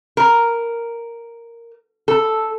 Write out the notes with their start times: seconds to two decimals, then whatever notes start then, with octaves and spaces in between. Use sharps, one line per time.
0.17 A#4
2.08 A4